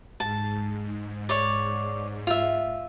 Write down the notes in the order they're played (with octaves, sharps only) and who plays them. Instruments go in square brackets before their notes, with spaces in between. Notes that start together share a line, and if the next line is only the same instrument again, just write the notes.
[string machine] G#2 [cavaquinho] A5
[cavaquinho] C#5 D5
F4 E5